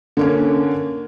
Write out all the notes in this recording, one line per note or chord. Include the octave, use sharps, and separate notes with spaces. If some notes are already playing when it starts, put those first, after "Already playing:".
D3 A#3 C#4